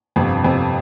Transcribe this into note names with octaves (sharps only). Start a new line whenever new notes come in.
G1 F2 C3
G1 F2 C3